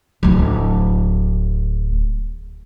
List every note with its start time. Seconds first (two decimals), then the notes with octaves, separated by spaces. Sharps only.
0.23 D1 D2